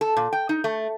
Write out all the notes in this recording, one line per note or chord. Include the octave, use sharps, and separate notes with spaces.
A4
A#2
G5
D#4
A3